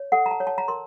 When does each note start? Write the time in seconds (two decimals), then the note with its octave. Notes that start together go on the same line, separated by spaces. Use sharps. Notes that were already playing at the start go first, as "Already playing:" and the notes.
Already playing: C#5
0.12 A4 F#5
0.26 A#5
0.31 A5
0.40 C#5
0.47 A5
0.58 A#5
0.68 A#4 C6